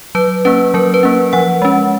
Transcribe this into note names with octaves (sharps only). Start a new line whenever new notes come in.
F#3 B4
A#3 C#4 B4
F#3 A#4
B4
A#3 C#4
F3 F#5
G#3 C#4